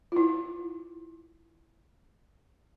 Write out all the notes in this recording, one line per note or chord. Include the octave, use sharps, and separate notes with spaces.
E4 F4